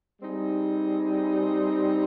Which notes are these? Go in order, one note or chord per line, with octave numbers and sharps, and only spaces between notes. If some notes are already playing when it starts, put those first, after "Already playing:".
G3 C4 D#4 G#4